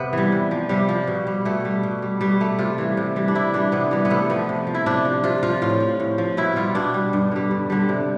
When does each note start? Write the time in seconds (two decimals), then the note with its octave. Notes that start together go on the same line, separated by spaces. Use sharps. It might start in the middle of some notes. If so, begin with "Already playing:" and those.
Already playing: C3 B3
0.13 E3 G3
0.32 C3
0.51 F3
0.69 C3 G3
0.89 F3
1.07 B2
1.27 G3
1.45 B2 A3
1.65 G3
1.83 B2
2.02 G3
2.21 B2 G3
2.40 G3 A3
2.59 C3 F4
2.78 E3 G3
2.97 C3
3.16 E3 G3
3.28 D4
3.35 C3 E4
3.53 E3 G3 D4
3.72 C3 B3
3.91 E3 G3
4.05 B3
4.10 C3 A3
4.30 F3 B3
4.49 C3
4.67 F3
4.75 E4
4.86 C3 D4
5.05 F3
5.24 C3 F4
5.43 F3 F4
5.62 A2 F4
5.80 F3
6.00 A2
6.18 F3
6.37 B2 E4
6.56 G3 F4
6.75 B2 D4
6.94 G3
7.13 G2
7.31 D3 G3
7.51 G2
7.70 D3 G3
7.89 C3